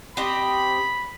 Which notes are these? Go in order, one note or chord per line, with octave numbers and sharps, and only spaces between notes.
C4 G4 D#5 B5